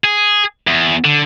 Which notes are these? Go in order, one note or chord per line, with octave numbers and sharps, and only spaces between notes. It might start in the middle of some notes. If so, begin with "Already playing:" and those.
G#4
E2
D3